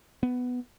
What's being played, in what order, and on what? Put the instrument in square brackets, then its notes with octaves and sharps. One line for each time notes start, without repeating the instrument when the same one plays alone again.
[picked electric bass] B3